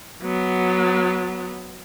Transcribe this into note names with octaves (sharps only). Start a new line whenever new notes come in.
F#3 B3